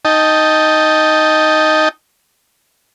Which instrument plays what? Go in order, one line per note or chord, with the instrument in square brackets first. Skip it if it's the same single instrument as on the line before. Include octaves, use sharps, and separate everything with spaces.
[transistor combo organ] D#4 D#5 G5 A5